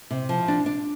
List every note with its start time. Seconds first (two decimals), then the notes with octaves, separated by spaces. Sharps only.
0.11 C3
0.29 F3
0.48 D4
0.66 D4